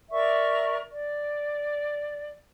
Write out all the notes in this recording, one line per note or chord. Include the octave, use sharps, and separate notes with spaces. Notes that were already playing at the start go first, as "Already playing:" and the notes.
A#4 D5 E5 C#6
D5